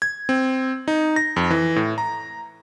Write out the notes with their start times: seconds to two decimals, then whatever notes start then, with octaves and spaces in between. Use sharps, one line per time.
0.02 G#6
0.29 C4
0.88 D#4
1.16 A#6
1.36 F2
1.51 E3
1.76 A2
1.98 A#5